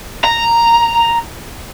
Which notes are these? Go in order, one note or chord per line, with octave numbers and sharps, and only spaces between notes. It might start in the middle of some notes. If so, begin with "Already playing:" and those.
A#5